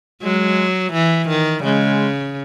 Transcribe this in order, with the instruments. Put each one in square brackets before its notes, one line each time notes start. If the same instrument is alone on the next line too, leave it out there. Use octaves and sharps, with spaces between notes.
[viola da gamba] F#3 [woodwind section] G#3
[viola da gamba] E3
D#3
[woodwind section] G3
[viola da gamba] C#3 [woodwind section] G#3